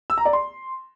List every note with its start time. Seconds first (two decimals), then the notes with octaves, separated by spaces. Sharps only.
0.10 E6
0.18 A#5
0.25 D5
0.33 C6